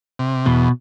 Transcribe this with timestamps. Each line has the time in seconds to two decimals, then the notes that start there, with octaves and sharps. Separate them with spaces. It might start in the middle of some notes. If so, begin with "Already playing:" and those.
0.19 C3
0.46 E2 B2